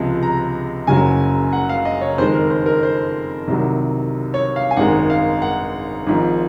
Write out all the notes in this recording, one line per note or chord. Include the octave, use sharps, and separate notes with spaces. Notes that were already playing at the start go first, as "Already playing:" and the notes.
Already playing: C#2 C3 F3 G#3
A#5
F#1 F#2 C#3 F#3 G#5
F#5
F5
D#5
C#5
F2 D#3 G#3 C5
A#4
C5
A#4
C5
C2 C3 D#3 F#3
C#5
F5
G#5
G#1 F#2 D#3 G#3 F#5
F5
F#5
G#1 G#2 F3